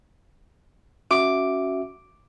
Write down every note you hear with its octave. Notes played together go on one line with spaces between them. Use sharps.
C#4 F#4 E5 D6